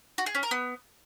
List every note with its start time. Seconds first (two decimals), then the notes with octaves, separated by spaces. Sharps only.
0.18 F#4
0.26 G#4
0.35 C#4
0.43 A#4
0.51 B3